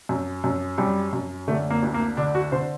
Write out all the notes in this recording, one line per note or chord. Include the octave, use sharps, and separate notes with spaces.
F#2
F#2
F#2 G3
F#2
D3 A3
A#3
D2
A#3
D3 D4
F#4
D3 C5